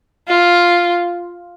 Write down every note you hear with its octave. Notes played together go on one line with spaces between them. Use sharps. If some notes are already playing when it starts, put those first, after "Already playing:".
F4